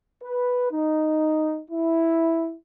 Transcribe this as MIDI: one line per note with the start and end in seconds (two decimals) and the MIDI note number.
0.22 0.68 71
0.71 1.60 63
1.70 2.54 64